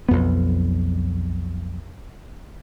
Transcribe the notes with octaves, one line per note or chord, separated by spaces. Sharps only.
B1 F2 B3